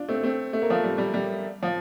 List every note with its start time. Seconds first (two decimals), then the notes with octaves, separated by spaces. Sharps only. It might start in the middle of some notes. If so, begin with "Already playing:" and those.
Already playing: D4 F4
0.08 A3 C4
0.23 A3 C4
0.53 A3
0.62 A#3
0.70 F3 A3
0.84 G3
0.98 G3
1.14 G3
1.63 F3